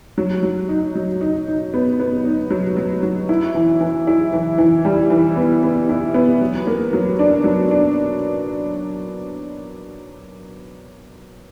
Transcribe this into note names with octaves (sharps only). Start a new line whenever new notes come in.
F#3
F#3
D#4
F#3
D#4
D#4
B3
B3
D#4
F#3
F#3
F#3
E4
E3
E3
E4
E3
E3
G3
E3
B3
B3
E4
B3
F#3
A#3
F#3
D4
F#3
D4